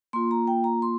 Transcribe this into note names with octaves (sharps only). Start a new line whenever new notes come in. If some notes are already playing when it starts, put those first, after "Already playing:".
A#3 F4 C6
A#5
G5
A#5
C6